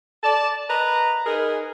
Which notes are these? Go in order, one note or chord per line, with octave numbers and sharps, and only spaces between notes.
D5 A5
B4 D#5 A#5
D#4 G#4 A#4 B4 G#5